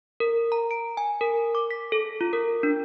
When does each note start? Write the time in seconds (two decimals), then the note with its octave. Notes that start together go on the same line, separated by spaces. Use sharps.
0.20 A#4
0.52 A#5
0.71 D7
0.97 G#5
1.21 A#4
1.55 D6
1.71 B6
1.92 A4
2.21 F4
2.33 A#4
2.63 D4